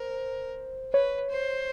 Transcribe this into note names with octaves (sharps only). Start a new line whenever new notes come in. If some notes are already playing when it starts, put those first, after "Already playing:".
Already playing: A#4 C5
B4 C#5
C5